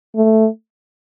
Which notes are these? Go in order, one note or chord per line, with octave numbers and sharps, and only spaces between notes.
A3